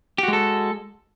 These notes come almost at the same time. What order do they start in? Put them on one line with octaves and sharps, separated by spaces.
G4 F#4 G#3 A4